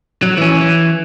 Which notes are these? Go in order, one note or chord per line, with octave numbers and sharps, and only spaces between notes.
F#3
E3 C#4
E3